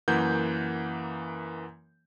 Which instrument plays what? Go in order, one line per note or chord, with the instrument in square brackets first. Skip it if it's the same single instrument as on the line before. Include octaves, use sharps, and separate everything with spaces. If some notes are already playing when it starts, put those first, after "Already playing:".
[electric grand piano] F#2 E3 A#3 F#5 G6